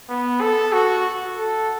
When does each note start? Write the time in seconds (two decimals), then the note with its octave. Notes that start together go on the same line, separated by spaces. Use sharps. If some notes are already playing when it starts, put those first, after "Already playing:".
0.09 B3
0.41 A4
0.73 F#4
1.37 A4